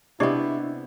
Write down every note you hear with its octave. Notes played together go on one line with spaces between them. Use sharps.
C3 B3 D4 E4 G4 D5 D#5